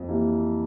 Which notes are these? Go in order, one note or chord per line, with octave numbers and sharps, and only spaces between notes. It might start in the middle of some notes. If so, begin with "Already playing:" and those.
Already playing: F2
E3 A#3 E4 G4